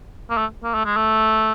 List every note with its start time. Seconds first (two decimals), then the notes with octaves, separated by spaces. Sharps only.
0.30 A#3
0.37 A3
0.63 A#3
0.74 A3
0.85 G#3
0.97 A3